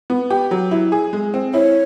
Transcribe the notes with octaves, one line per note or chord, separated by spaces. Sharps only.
B3
G4
F#3
E4
G#4
G#3
C4
E4 C#5